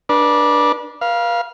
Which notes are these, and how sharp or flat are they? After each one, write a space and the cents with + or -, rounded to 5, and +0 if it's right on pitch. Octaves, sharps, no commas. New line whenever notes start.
D4 +0 B4 -35 D6 +0
B4 -45 F5 -5